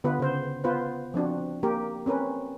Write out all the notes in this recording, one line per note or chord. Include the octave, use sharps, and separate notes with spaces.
D3 B3 F4 B4
C#3 C5
B3 F4 B4 C5
F3 C4 D4 F#4
A#3 G4 A#4
C4 C#4 A#4 B4